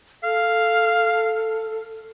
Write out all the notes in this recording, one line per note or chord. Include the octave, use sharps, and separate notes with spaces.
A4 F5 F6